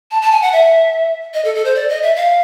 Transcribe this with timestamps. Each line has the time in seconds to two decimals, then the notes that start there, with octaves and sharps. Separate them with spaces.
0.11 A5
0.22 A5
0.32 G#5
0.42 F#5
0.53 E5
1.34 D#5
1.45 A4
1.55 A4
1.65 C5
1.75 D5
1.89 D#5
2.03 E5
2.16 F5